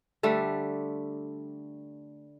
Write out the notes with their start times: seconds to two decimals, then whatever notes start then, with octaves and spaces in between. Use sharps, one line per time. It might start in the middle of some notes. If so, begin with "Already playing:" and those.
0.23 D3 G3 A3